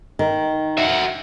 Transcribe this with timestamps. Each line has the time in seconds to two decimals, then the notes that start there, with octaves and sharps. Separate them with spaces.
0.19 D#3
0.78 F#4 E5